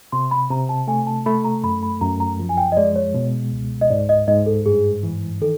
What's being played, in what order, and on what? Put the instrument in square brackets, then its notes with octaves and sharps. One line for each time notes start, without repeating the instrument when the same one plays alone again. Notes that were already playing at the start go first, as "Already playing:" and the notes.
[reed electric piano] C3 [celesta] C6
[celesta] B5
[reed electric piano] C3 [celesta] A#5
[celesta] A5
[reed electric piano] A3 [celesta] G#5
[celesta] A5
[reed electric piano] A3 [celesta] B5
[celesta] A#5
[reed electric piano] F#2 [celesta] B5
[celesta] B5
[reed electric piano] F#2 [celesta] A#5
[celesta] A#5
[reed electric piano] F3
[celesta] G#5
G5
D#5
[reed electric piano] G#3 [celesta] D5
[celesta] C#5
[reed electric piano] B2
C#2
[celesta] D#5
[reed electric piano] G#2 [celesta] D5
[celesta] D#5
[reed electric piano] G#2 [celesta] D#5
[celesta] A4
[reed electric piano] G2 [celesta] G#4
[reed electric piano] E3
[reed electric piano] D#3 [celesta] A4